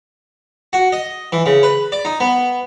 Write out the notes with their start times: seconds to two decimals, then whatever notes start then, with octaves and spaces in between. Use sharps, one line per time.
0.73 F#4
0.92 D#5
1.32 E3
1.46 C#3
1.63 B4
1.92 D5
2.05 D#4
2.20 B3